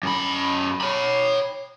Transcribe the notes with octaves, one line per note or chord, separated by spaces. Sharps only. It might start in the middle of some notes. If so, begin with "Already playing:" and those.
F#2 B5
C#5 B5